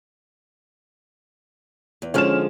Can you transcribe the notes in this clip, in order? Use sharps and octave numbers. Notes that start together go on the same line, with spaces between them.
E2
D3 F3 G#3 C#4 F6 E7